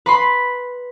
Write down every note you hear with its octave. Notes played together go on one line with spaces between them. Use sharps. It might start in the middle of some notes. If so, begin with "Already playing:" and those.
B4 B5 C6